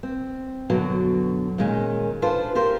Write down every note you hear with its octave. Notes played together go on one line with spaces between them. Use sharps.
C4
F#2 B2 D3 F#3
A#2 D#3 G#3 C#4
D4 F4 A4 B4 C5
F4 G4 A#4 C5